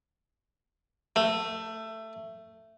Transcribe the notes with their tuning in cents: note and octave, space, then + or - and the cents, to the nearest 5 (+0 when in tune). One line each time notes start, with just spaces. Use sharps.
A3 +15